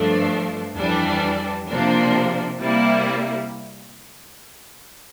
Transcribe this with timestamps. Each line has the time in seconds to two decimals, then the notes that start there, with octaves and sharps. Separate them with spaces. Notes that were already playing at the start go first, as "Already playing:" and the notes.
Already playing: G2 F3 A3 D4
0.77 F2 E3 G3 D4
1.67 C3 F3 A#3 D4
2.58 C3 G3 A#3 E4